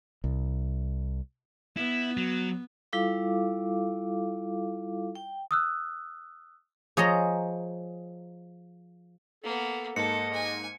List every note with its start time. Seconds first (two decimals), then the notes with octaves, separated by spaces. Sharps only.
0.24 C2
1.77 B3 E4
2.17 F#3
2.93 G3 E4 F4 A4 F5 D6
5.15 G5
5.51 D#6 E6 F#6
6.97 F3 G#4 C#5 D#5 A#5
9.44 A#3 B3 A4
9.96 G#2 A#3 A4 D#5 C#7
10.33 G#5